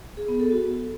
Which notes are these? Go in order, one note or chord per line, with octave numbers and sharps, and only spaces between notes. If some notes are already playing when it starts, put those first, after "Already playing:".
G#4
B3
A4
F#4